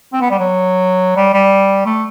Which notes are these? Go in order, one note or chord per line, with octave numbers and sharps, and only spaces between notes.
C4
B3
G3
F#3
G3
G3
A3